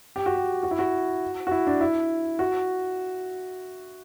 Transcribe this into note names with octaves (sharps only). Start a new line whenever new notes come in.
G4
F#4
G4
F#4
E4
F#4
F#4
E4
D4
E4
F#4